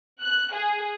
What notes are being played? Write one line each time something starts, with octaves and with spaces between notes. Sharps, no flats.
F#6
G#4